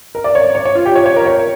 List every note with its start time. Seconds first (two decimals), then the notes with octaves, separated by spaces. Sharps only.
0.15 A#4
0.24 D5
0.35 C#5
0.55 C#5
0.65 C#5
0.75 F4
0.86 G4
0.96 C#5
1.06 C#5
1.16 A#4
1.26 C#5